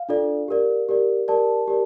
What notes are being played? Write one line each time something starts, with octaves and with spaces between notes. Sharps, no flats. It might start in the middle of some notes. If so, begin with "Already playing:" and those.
Already playing: F5
D4 F4 A4 D5
G4 A#4 D5
G4 A#4 D5
G4 A#4 D5 A5
G4 A#4 D5